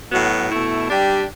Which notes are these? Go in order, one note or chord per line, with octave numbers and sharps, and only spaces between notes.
A2 F#3 B3 F#4
B2 A3 E4
G3 D4 G4